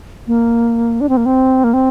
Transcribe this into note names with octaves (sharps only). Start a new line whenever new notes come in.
A#3
D4
C4
A#3
C4
A#3
C4